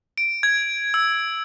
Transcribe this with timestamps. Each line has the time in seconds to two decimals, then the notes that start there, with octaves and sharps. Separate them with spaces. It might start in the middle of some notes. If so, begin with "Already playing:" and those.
0.18 D7
0.43 G#6
0.94 E6